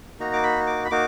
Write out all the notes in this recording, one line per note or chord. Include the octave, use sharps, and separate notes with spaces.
A#3 D#4 F#4 A#5
D6
B5
D6
B5
A#3 D#4 F#4 D6